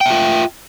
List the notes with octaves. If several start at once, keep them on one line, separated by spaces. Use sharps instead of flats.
F4 E5 G5